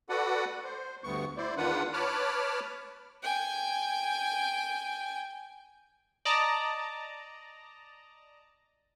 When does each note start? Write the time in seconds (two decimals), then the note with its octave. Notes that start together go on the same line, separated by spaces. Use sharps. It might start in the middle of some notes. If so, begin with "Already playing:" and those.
0.09 F#4 A4 B4 D5 F#5
0.64 C5
1.04 D2 G2 B3 C#6
1.37 E4 C5 D5
1.57 E2 D#3 D4 F4 B4 F#5
1.93 B4 C#5 A5 B5 D6 F6
3.23 G5 G#5
6.25 D5 D#5 A5 A#5